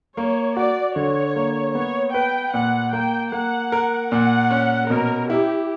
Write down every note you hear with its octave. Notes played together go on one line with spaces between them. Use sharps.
A#3 C#5
F#4 D5
D3 C#5
A#3
B3 C#5
B4 G5
A#2 F#5
A#3 G5
A#3 F#5
A#4
A#2 F#5
C#4
B2 A#4
E4 G4